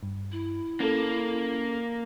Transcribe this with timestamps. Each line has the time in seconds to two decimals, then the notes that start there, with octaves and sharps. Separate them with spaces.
0.03 G2
0.31 E4
0.80 A#3 C#4 A4